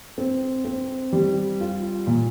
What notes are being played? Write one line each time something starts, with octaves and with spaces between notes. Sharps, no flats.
C4
C4
G3
F4
A#2